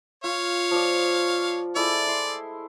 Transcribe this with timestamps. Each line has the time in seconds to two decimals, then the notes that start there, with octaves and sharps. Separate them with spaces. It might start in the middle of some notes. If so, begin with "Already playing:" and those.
0.24 F4 C#5 F5
0.71 F3 D5
1.76 G#3 A3 E4 D5
2.07 E4 C6